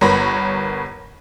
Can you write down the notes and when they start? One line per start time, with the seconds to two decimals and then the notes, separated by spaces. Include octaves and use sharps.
0.01 G1 B3 A#4 C#5 B5 A#6